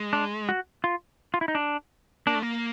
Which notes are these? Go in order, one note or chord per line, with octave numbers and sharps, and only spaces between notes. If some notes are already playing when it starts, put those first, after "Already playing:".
Already playing: G#3
D4
F#4
F4
F4
E4
D#4
D4
A#3 D4
A3
A#3